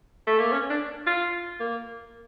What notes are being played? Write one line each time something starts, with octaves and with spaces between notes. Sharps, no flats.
A3
A#3
C#4
D4
F4
A#3